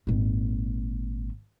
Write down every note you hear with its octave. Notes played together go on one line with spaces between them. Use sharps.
G#1 A#2